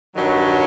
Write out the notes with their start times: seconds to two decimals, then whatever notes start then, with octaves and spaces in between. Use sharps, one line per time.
0.15 G2 D#3 F#3